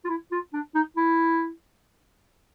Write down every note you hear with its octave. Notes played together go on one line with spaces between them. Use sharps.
F4
E4
F4
D4
D#4
E4